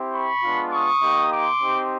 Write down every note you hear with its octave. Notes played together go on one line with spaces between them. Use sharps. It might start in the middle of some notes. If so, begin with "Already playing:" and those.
Already playing: C4 E4 G4
B5 C#6
G#3 B3 D4 F4
C#6 D#6
A#3 D#4 G4
C6 D6
C4 D#4 G4